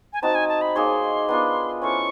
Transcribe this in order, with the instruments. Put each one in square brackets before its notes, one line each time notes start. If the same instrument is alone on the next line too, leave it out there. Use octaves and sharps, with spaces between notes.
[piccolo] G#5
[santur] C4 D#4 F#4 [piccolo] A5
[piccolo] G#5
A5
B5
[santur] A#3 D#4 G#4 C#5 [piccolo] C6
[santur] B3 D4 F4 A#4
[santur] C#4 E4 A4 C5 [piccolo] C#6